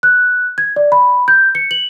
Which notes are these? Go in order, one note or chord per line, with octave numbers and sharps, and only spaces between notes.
F#6
G#6
D5
B5
G6
C#7
F#7